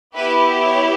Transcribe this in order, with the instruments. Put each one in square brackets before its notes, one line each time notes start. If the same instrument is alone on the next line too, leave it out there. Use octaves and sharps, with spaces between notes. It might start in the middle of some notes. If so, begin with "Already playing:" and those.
[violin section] B3 E4 G4 B4
C#5